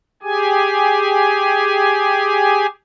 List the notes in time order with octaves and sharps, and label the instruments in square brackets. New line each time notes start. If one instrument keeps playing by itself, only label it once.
[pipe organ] G4 G#4 G#5